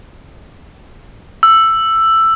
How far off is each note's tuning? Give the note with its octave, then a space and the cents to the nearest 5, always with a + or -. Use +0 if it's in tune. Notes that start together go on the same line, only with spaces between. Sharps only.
E6 +10